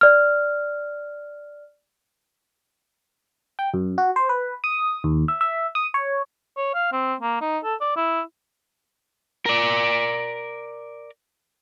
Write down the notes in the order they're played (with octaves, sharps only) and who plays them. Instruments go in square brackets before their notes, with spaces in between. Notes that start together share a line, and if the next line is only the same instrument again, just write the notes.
[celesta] D5 F6
[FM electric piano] G5
F#2
F#4
C5
B4
D#6
D#2
E5
E5
D#6
C#5
[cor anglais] C#5
F5
C4
A#3
D#4
A4
D5
E4
[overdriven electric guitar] A#4 D5